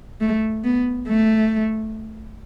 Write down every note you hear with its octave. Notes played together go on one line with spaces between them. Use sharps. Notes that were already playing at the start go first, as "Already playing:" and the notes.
A3
B3
A3